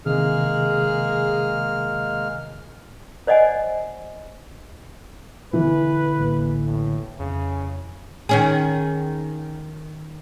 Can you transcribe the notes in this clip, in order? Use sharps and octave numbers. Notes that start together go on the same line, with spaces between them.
C3 D#3 E3 G#3 A#3 G#4 F6
C5 D5 D#5 F#5 G#5
B2 D3 E3 B4
A1 D2 A#3
A2
F2 C#3
D#3 C#4 G#4